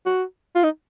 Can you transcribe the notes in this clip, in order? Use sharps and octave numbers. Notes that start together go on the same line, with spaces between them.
F#4
F4
D#4